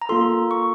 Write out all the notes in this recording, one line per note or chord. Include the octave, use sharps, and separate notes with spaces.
A#5
A#3 F4 A4 C6
C#6